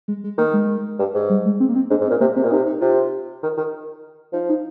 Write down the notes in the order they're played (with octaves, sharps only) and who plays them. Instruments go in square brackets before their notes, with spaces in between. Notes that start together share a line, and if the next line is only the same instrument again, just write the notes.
[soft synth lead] G#3
G#3
[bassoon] D#3 [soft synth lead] A#3
[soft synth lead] G#3
[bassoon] G2
G#2
[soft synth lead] G3
G#3
C4
A#3
C4
[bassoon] G#2 [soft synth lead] D4
[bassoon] G#2
[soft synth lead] C4
[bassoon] A#2
[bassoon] C3 [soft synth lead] A#3
[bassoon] C3 [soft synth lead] C4
[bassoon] A#2
[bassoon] C3 [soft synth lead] D#4
[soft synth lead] D#4
[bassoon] C3 [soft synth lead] F4
[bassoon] D#3
D#3
[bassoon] F3 [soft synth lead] D#4
[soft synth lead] D#4